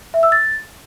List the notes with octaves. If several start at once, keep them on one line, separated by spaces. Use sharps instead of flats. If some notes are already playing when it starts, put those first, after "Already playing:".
E5
E6
A6